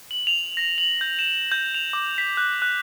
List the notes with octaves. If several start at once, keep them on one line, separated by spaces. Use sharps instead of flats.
F#7
F7
A#6
F#7
G6
E7
G6
F7
D6
B6
F#6
F#6